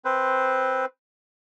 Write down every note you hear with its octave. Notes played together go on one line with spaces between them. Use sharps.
C4 B4 C5